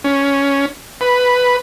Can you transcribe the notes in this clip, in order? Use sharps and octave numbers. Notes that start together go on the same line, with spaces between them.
C#4
B4